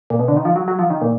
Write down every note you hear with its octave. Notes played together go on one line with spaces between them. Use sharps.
A#2
B2
D3
D#3
F3
F#3
F#3
F3
D#3
A#2